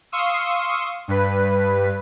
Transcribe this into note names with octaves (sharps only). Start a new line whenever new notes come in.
F5 C6 C#6 D#6 E6
G2 B4